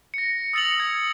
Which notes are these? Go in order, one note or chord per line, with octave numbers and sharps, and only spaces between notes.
A#6 C#7
D#6 E6 A6 C#7 F7 F#7
D#6 G#6